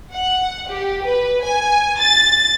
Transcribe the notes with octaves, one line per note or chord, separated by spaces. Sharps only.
F#5
G4
B4
G#5
A6